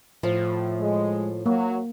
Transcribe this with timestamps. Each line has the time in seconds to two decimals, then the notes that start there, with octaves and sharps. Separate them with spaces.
0.23 A2 F3
0.80 G#3
1.46 F#3 A#3 F#4